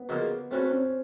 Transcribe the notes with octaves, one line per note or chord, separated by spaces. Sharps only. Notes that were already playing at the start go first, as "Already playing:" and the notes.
Already playing: B3
C#3 F3 A#3 D#4 F#4
A3 C4 C#4 F#4 B4
C#4